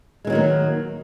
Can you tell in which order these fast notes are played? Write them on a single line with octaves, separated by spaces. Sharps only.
G#3 E3 F#3 D#3 A#3